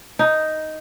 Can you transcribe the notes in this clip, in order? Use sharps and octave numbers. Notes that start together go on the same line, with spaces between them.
D#4